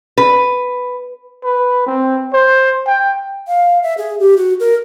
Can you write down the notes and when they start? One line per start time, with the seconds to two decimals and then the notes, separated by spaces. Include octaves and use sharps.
0.18 B4
1.43 B4
1.86 C4
2.33 C5
2.86 G5
3.48 F5
3.83 E5
3.98 G#4
4.20 G4
4.37 F#4
4.60 A#4